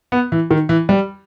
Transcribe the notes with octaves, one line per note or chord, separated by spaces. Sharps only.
B3
E3
D#3
E3
G3